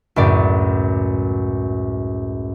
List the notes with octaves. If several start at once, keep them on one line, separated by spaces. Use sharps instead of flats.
C#2 F#2 A2 D5